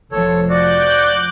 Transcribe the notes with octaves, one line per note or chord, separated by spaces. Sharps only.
F1 F3 A4 C#5
F#4 D5 D6 F#6 G6